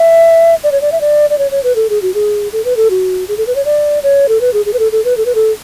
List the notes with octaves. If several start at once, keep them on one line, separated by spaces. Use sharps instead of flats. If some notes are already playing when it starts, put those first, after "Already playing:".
Already playing: E5
D5
C#5
D5
E5
D5
D5
C#5
C#5
B4
A4
G#4
F#4
G#4
A4
B4
A4
F#4
G#4
A4
B4
C#5
D5
C#5
A4
B4
G#4
G#4
B4
A4
A4
B4
A4
B4
A4